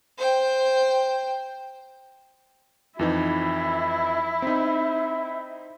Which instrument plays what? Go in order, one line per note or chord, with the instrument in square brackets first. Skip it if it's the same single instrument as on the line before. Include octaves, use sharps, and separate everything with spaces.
[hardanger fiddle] C5 G5
[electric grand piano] F2 E3 D#4 [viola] E4
[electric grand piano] C4 D#4